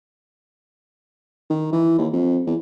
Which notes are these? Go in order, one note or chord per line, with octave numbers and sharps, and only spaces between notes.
D#3
E3
D#2
F2
E2